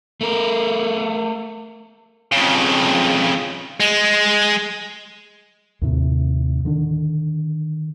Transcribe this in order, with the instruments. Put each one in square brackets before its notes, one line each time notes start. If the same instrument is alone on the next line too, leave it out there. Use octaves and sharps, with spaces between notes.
[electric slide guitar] A3 A#4
[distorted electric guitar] F2 C#3
G#3
[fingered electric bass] D#2 A2 C3
D3 D#3 D4